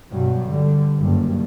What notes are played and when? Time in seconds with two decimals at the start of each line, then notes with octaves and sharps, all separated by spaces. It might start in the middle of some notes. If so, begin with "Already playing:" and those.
0.10 G2 B2 F#3
0.48 D3 G3
0.97 F#1 G2